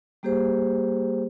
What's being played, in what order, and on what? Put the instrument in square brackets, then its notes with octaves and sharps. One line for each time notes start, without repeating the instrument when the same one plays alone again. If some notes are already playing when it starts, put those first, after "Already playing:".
[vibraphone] G3 A#3 G4 G#4 C5